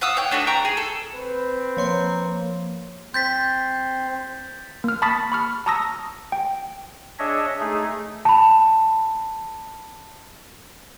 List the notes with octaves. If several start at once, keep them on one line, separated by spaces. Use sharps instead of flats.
F5 F#5 D#6 E6
C#5 F#5 G5
A3 D4 F#4 A4
G5 A#5 C#6
G#4
A4
C4 B4
F3 A#3 C#5 C6
C4 C6 G6 A6 B6
A#3 F6
A5 B5 C#6 D#6 A6 B6
B5 C#6 F6
A5 A#5 C#6 D#6 E6 A#6
G5
D4 G#4 C#5 D#5 E5
A3 D#4 G#4
A5 B5